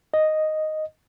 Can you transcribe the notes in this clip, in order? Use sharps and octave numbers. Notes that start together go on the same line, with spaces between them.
D#5